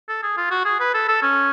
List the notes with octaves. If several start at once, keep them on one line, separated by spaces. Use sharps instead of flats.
A4
G#4
F4
F#4
G#4
B4
A4
A4
C#4